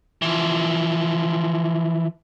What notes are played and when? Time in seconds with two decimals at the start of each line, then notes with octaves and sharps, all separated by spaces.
0.22 E3 F3